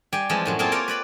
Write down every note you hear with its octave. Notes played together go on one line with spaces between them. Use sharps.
G3 D5 G5 G#5
E3 F3 G#3 C4 F4
F#2 A2 F#3
A#3 C4 E4 F4 G#4 A4
A#4 C#5 D5 F5 G5 A#5
B4 D5 B5